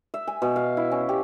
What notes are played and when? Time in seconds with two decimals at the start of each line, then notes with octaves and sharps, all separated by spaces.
0.14 E5
0.27 G#5
0.42 B2
0.56 F5
0.77 E4
0.91 C#4
1.09 G4